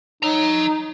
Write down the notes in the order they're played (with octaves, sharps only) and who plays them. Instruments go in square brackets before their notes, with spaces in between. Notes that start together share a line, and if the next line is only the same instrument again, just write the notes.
[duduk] D#4 [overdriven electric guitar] C#5 A#5